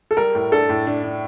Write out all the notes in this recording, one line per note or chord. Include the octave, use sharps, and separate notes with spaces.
A4
G3 A#4
A2
D4 A4
A2
D4
D4